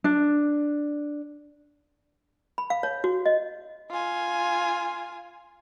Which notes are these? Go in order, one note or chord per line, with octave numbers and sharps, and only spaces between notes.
D4
B5
F5
C#5
F#4
D#5
F4 G#5